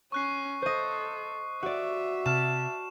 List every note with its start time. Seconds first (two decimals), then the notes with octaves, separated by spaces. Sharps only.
0.12 C#4 C#6 F#6 C7
0.62 A4 C5 D#5
1.63 F#4 D5 E5
2.26 C3 A5 F6 E7